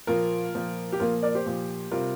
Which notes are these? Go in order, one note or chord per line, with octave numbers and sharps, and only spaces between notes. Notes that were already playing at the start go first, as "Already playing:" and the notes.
A#2 F3 A#3 F4 A#4
A#2 F3 A#3
G4
A#2 F3 A#3 F4 A#4
A#4 D5
G4 C5
A#2 F3 A#3
C3 G3 F4 A#4